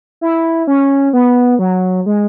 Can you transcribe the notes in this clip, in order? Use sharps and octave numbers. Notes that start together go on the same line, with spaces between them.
E4
C#4
B3
F#3
G#3